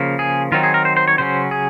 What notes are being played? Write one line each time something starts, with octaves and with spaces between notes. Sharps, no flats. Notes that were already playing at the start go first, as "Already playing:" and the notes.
Already playing: C#3 F3 A#3
G#4
D#3 F#3 C4 D#4 F4
G#4
A#4
C5
C5
C#5
C#3 F#3 C#4 C5
G#4